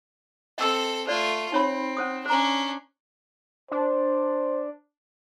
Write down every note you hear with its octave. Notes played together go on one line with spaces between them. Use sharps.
C4 A4 D#5 E6
A3 F4 C5 D5
C4 D#4 C#5 B5
C#4 C5 D#6
C#4 D4 C5 A#5
D4 C5